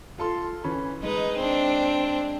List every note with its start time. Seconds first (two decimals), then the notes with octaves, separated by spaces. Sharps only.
0.18 F4 A4 C6
0.64 E3 C#4 B5
1.03 G#3 D#4 B4
1.37 C4 D4